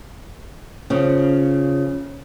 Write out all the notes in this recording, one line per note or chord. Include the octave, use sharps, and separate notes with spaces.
C#3 F3